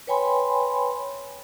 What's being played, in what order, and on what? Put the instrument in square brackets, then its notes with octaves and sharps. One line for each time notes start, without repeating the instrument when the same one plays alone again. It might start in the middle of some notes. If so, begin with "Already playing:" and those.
[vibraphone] B4 C#5 G5 G#5 B5 C6